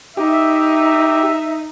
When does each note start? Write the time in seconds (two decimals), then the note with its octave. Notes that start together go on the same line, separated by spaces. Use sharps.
0.17 D#4 G4 E5